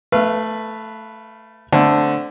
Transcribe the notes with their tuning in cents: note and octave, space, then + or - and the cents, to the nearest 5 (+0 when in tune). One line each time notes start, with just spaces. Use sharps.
A3 +0 B4 +0 F5 -30
D3 +0 A3 +0 C4 +0